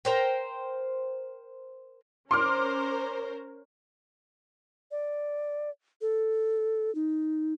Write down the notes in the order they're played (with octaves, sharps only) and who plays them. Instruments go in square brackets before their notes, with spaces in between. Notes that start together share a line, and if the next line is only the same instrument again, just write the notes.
[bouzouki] A#4 C5 G5
[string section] C#4 A#4 C5 [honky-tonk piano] C6 D6 F6
[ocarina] D5
A4
D#4